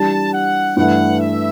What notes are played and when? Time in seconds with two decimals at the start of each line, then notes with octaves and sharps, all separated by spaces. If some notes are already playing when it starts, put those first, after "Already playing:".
Already playing: E3 G3 D4 G4 A5
0.33 F#5
0.77 G2 E3 A3 F#5
1.20 E5